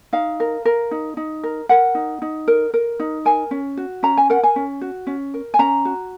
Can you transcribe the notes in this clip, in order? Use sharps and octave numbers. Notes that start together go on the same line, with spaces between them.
D#4 F5
A#4
A#4
D#4
D#4
A#4
A#4 F#5
D#4
D#4
A#4
A#4
D#4
A#4 G#5
C#4
F#4
C#4 A#5
G#5
A#4 F#5
G#5
C#4
F#4
C#4
A#4
G#5
C#4 A#5
F#4